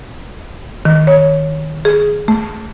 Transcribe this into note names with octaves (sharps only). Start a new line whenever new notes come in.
D#3
C#5
G#4
A3